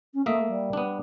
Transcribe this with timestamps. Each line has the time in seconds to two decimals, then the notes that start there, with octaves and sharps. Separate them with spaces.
0.14 C#4
0.26 A3 A#3 D#5 E5
0.48 G3
0.73 B3 D4